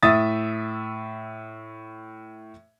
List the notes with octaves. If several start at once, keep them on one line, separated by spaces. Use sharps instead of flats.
A2 E5 D#6 A6